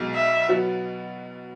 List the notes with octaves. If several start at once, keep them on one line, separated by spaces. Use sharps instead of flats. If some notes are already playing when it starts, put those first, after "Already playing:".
Already playing: B1 B2 G#3
E5
B2 F#3 B3